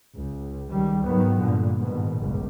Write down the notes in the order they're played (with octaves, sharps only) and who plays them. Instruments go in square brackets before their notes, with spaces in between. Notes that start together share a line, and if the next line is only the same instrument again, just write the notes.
[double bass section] C#2
C#2 D#3 G3
G#2 D#3 F#3 B3
G2 A#2 D3
G#2 B2 D#3
G1 C#2 F#2